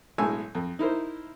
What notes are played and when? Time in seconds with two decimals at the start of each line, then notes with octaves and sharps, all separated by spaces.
0.18 B1 A2 G#3 G#5 E6
0.55 F2
0.79 D#4 E4 A#4 C5